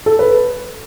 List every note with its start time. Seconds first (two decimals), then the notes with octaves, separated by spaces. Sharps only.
0.06 A4
0.19 B4